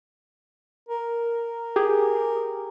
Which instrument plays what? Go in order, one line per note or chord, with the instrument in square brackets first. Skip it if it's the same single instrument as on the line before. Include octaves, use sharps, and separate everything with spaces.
[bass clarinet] A#4
[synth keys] G4 G#4